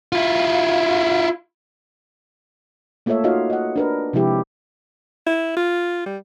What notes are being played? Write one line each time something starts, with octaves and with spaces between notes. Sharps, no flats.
E4 F4
A3 A#3 F4 A4 C#5 E5
D#4 F4 F#4 C#5 D#5 F5
D#5 F#5
D4 A#4 B4
C3 F3 G#3 E4 G4
E4
F4
G3